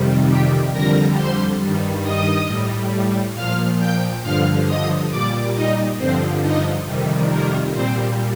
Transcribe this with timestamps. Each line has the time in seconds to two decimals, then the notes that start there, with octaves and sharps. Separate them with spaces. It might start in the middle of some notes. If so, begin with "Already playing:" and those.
Already playing: F2 C3 D#3 G3
0.28 G4 G5
0.72 F2 D3 G3 A#4 A#5
1.16 C5 C6
1.59 G2 D#3 G3
2.03 D#5 D#6
2.47 A2 G3
3.35 A#2 F3 F5 F6
3.79 G5 G6
4.23 G2 D3 F3 F5 F6
4.66 D#5 D#6
5.10 A#2 G3 D5 D6
5.54 D#4 D#5
5.98 G2 D3 F3 C4 C5
6.42 D#4 D#5
6.85 F2 C3 D#3 G3
7.30 A#3 A#4
7.73 A#2 G3 C4 C5